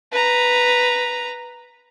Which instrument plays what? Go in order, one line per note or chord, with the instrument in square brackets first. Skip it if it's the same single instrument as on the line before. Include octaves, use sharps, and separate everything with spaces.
[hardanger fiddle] B4 A#5